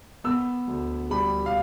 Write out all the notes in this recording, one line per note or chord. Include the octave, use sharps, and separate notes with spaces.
B3 E6
D2
G3 B5
F5